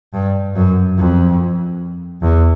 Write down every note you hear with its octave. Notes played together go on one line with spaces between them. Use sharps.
G2
F#2
F2
E2